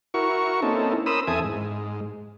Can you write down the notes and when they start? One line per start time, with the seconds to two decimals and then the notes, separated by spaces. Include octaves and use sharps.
0.14 E4 F#4 A#4 C#6
0.62 A#3 C4 C#4 D#4 E4 A4
1.06 C#4 A#4 C5 B5 D#6 E6
1.27 E2 C4 A4 E5 G#5 D#6
1.44 G#2